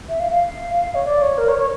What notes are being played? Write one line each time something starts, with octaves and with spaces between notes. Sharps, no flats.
E5
F5
F5
C#5
D5
C#5
A#4
C#5
C#5